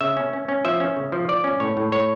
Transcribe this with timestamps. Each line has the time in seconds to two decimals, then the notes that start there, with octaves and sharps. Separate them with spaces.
0.01 C#3 E5
0.17 C#4
0.33 C#4
0.48 C#4
0.65 F3 E5
0.80 C#4
0.96 C#3
1.12 F3
1.29 F3 D5
1.44 C#4
1.60 A2 C#5
1.77 A2
1.92 A2 C#5